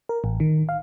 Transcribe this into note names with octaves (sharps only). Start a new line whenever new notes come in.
A#4
A1
D#3
F5